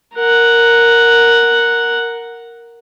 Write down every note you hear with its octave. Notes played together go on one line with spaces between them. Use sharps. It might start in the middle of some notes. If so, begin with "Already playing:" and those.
A#4 F#5